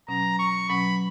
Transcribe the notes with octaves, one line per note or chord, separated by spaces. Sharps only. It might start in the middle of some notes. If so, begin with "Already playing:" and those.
B2 F#3 C#4 A#5
C#6
B2 F#3 C#4 B5